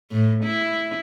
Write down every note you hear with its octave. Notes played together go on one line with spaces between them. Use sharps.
A2
E4